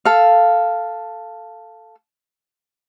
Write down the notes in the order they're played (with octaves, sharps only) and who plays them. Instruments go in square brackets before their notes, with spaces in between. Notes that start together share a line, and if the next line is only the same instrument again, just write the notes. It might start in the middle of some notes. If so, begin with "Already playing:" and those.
[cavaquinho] A4 F5